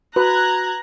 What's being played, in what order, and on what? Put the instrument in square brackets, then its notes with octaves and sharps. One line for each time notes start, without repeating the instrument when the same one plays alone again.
[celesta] F#4 [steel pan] B4 [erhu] A#5 [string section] F#6 G#6